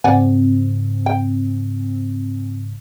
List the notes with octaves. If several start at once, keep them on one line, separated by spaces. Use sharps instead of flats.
G#2 C#3 C4 D5 F#5 G#5
G5